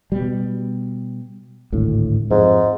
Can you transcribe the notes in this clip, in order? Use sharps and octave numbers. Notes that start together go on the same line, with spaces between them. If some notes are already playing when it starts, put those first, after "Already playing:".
B2 G3
G#1 D2 A2
F2 G#2